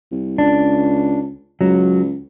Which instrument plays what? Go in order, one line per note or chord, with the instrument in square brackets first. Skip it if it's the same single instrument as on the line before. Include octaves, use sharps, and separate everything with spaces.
[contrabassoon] C2
[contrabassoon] C#2 [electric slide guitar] D4
[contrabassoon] C#2 [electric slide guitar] F#3